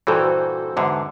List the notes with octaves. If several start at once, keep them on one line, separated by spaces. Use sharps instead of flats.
G2 A#2 E3 F#4 A4 C5
E2 G#2 D3